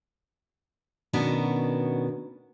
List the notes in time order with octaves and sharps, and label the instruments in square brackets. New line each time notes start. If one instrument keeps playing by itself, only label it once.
[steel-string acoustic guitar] B2 D#3 B3 C#4 D4 F#4